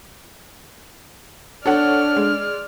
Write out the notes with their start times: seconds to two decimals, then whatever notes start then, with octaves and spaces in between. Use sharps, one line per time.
1.66 D4 A4 C#5 D5 F#5 F6
2.16 G#3